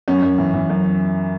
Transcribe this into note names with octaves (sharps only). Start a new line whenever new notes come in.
F#2 C#4
F#2
E3
E3
F#2